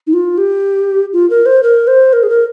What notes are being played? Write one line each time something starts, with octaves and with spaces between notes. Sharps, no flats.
D#4
F4
G4
F4
A#4
C5
A#4
C5
A#4
G#4
A#4